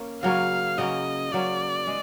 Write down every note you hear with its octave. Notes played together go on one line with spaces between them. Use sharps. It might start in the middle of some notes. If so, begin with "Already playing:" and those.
Already playing: A#3 C#4
C#3 F#3 A#3 C#4 F5
C#3 F#3 A#3 C#4 D#5
C#3 F#3 A#3 C#4 D5
G#3